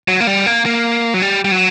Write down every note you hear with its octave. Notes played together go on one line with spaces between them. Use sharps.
F#3
A#3
G3
A#3
A#3
F#3
G3
G3
F#3